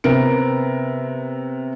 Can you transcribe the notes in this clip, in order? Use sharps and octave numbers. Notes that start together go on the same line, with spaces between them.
C3 B3 A#4 D7